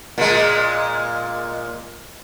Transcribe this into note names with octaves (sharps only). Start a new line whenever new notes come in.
A#2 G#3